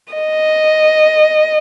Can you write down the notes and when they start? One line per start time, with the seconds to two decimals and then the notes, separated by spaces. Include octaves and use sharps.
0.14 D#5